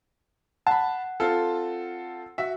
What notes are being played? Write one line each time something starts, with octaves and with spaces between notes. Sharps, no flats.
F#5 A5 B5
C4 F4 A4
F#4 E5